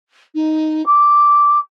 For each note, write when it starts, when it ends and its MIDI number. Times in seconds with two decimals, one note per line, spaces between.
0.34 0.84 63
0.85 1.58 86